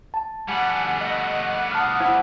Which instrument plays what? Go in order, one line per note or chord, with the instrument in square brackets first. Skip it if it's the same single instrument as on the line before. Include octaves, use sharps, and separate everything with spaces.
[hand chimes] A5
[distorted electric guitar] G3 A3 [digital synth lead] F#5 [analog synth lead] G#5
[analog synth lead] D#5 [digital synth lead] F#5
[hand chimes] A5 F6 [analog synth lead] D#6
[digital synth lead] E4 [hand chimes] C5 F#5